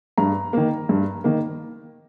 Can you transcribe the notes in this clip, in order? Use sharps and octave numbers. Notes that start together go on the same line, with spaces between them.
G2 A#5
D#3 A#3
G2
D#3 A#3